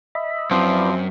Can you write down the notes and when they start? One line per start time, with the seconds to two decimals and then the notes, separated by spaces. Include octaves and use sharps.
0.15 D#5 E5 B5
0.51 F#2 F3 C4 E4 B4 D5